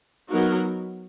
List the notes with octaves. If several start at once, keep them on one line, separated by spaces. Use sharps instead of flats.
F#3 B3 D#4 F#4 A#4